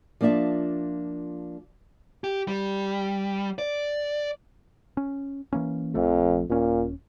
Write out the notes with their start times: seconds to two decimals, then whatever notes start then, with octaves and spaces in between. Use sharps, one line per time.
0.21 F3 A#3 D4 F4 E5 A5
2.24 G4
2.48 G3
3.58 D5
4.97 C#4
5.53 E3 A#3 C#4
5.95 A#1 F2 F3 A3
6.50 D#1 A#2 C#4